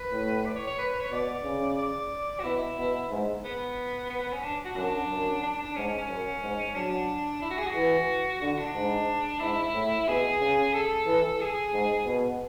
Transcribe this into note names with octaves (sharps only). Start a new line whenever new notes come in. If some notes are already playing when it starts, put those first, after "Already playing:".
Already playing: B4
A2
D5
C#5
C#5
B4
B4
C#5
B2 D5
C#3
D5
F#4
B2 E4
B2
G#2
B3
B3
B3
C#4
D4
F#4
F#2 D4
F#2
D4
D4
D4
G#2 C#4
C#4
C#4
F#2
G#2
F#3 D4
E4
F#4
G#4
F#4
E3
D3 F#4
D4
G#2
G#2 E4
A2
B2 G#4
C#3
A4
E3
G#4
G#2
B2